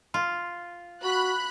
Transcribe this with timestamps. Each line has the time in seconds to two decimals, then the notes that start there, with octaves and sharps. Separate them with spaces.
0.14 F4
1.04 F#4 B5 F#6